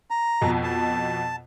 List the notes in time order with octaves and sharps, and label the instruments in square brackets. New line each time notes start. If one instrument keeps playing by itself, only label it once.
[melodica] A#5
[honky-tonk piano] F2 B2
[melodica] A5